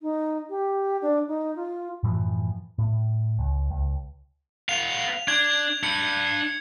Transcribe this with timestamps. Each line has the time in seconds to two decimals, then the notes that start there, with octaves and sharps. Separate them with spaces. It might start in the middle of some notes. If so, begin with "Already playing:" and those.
0.02 D#4
0.50 G4
1.02 D4
1.28 D#4
1.56 F4
2.03 F#2 A2 E3 F3
2.78 A2
3.39 C#2
3.71 C#2
4.69 B3 F5 F7
5.28 D4 G#6
5.83 D4 B5 C#7